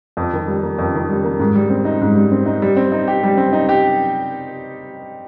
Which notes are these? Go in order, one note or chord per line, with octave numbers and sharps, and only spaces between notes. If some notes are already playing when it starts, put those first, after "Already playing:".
F2
D#3
G3
A#3
F2
D#3
G3
A#3
G#2
G3
C4
D#4
G#2
G3
C4
D#4
G3
C4
D#4
G4
G3
C4
D#4
G4